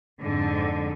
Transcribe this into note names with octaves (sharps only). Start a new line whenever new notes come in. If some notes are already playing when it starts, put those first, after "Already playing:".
F2 G#2 D3